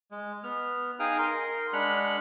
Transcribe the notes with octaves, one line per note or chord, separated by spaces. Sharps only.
G#3
B3 F6
D#4 G#4 F5 G5 D#6 F6
A#4 C6
G#3 D4 F#5 B5 F6 F#6